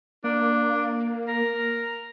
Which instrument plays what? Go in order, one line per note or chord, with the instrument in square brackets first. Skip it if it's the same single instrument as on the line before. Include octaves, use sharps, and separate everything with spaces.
[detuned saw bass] A#3 [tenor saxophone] D4
[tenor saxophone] A#4